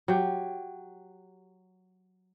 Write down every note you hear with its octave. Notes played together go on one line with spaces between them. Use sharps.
F#3 G4